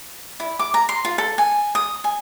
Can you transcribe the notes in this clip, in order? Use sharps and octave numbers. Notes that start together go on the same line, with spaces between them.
E4
D6
A#5
C6
F4
A4
G#5
D#6
G#5